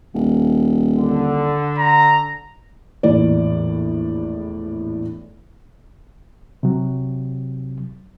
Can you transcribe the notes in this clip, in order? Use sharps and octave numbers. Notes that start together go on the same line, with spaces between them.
D#1
D3
A#5
A#1 E2 A2 D5
C3 F#3